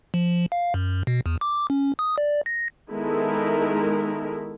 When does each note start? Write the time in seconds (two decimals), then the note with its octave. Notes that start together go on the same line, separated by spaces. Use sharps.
0.14 F3
0.52 F5
0.74 F#2
1.07 B2
1.26 E2
1.41 D6
1.70 C#4
1.99 D#6
2.18 D5
2.46 A#6
2.90 D#3 G#3 B3 E4 A4 A#4